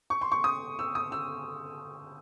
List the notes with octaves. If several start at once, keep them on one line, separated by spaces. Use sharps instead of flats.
C#6
C6
C#6
D#6
E6
D#6
E6